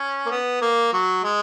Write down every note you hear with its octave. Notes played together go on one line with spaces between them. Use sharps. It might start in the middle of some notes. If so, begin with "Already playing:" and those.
Already playing: C#4
A#3
B3
A#3
F#3
G#3